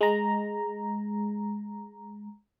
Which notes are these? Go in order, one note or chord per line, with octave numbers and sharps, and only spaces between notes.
G#3 A#5